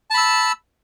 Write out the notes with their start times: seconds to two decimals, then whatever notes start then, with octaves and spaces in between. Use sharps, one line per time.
0.10 A5
0.14 B5
0.18 E6